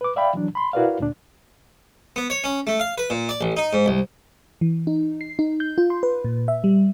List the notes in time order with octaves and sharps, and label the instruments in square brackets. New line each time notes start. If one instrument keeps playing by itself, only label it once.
[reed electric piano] B4 D6
D5 E5 F5 G5 B5
E3 F#3 D4
B5 C6
E4 F#4 A#4 B4 D5 F5
D2 A#2 D4
[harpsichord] B3
C#5
C#4
A3
F5
B4
A#2
D5
A1
D#4
G#2
C2
[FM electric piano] E3
D#4
C7
D#4
G6
F4
C6
B4
A#2
E5
G3